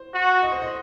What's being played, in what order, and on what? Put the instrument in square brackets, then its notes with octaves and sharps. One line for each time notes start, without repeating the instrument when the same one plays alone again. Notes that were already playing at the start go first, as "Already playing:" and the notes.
Already playing: [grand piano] C5
[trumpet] F#4
[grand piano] D#5
C5
D#5